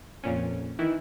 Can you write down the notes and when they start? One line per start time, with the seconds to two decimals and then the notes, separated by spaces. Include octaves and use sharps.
0.23 F2 A#2 C#4
0.79 D#3 E3 E4